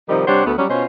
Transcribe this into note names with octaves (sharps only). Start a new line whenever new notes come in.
C3 D#3 F3 G3 D#4
C3 G3 D4 C5 C#5 F#5
D2 A3 B3
F#3 G3 C#4
B2 C#4 F4 C5 C#5 D#5